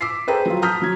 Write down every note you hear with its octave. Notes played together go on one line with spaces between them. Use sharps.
D6 E6 B6 C7
G#4 A4 B4 C5 G5 A#5
F#3 F4
A5 A#5 D#6 F6 G6 B6
F#3 G#6